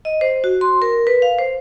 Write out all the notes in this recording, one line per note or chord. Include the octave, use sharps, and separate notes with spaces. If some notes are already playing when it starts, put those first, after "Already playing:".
D#5
C5
F#4
C6
A#4
B4
F5
C5